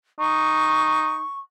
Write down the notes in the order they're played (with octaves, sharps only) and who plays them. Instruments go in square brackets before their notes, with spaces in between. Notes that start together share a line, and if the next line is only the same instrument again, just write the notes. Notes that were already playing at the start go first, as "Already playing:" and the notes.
[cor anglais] D#4 [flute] C#6